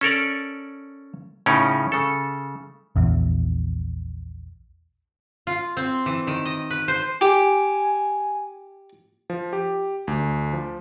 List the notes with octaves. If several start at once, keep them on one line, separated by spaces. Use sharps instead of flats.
C#4 A4 A#4 D5
A2 C#3 C#4 D#4 A#4 D5
C#3 A4
A#1 E2
F4
C4
E3
D#3
D#5
B4
C5
G4 G#5
F3
G4
D2
F3